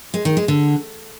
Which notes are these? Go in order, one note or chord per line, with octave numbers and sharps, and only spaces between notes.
G#3
D#3
G#3
D3